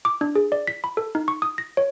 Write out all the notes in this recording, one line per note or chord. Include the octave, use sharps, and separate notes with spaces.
D6
D4
G#4
D5
B6
B5
A4
D#4
C#6
D#6
A#6
C#5